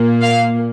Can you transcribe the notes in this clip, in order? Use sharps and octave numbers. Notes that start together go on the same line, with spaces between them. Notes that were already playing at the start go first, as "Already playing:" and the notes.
Already playing: A#2 A#3
F5